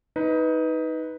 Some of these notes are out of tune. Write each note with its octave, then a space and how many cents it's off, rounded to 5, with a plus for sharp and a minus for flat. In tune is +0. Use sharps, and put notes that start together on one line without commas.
D#4 +20 B4 +0